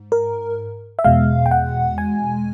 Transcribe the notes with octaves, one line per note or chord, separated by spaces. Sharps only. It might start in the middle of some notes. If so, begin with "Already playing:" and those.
Already playing: G#2
A#4
E5
E2 B2 G#3 F5
G5
F#5
G#5